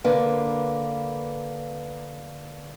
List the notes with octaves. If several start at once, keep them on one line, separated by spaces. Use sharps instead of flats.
D3 A#3 B4